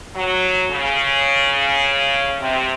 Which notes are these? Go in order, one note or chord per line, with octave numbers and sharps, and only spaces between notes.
F#3
C#3
C3